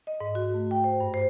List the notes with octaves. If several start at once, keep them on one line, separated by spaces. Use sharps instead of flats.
D#5
G#2
F#4
A3
G5
C5
G2
C5